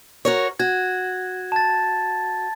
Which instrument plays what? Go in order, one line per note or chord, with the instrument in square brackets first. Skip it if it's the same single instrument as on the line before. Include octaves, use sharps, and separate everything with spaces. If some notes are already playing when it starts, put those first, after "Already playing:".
[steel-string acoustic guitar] F#4 A#4 C#5
[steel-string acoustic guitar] F#4 [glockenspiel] G#6
[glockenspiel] A5 A6